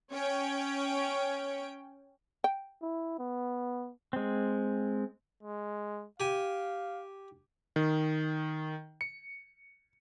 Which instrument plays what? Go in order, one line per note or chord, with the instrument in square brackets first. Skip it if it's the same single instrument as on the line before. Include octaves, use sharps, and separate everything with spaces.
[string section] C#4 C#5 G5
[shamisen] G5
[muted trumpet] E4
B3
[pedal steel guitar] G#3 C4
[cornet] G#3
[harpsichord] G4 G#5 [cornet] F5
[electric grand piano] D#3
C#7